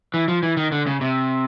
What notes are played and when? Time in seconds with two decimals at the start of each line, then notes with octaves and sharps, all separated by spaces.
0.14 E3
0.28 F3
0.43 E3
0.57 D#3
0.72 D3
0.87 C#3
1.01 C3